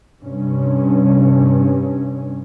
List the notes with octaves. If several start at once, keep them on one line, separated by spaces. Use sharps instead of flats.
G2 C3 C#4